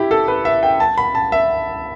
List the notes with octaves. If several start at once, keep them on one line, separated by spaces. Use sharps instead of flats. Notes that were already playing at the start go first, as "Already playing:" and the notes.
Already playing: E4 G4
A4
B4
E5
G5
A5
B5
A5
E5